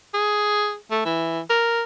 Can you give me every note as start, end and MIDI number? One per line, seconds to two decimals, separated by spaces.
0.14 0.75 68
0.91 1.01 57
1.05 1.40 52
1.50 1.84 70